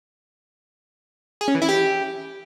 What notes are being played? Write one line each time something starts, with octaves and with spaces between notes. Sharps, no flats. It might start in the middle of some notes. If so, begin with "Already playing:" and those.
G#4
C#4
E3
E4
G4